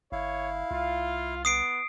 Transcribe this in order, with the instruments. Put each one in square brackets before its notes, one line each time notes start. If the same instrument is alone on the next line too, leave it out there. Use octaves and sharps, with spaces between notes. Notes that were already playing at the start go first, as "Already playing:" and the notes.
[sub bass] G1 [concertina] E4 F5 [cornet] C#5
[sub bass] C2 [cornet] F4
[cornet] B3 [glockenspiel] D#6 C7 D7